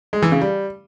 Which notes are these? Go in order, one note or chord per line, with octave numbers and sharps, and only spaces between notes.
G#3
E3
C#3
G3